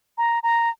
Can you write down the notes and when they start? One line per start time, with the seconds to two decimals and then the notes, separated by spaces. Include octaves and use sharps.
0.18 A#5
0.43 A#5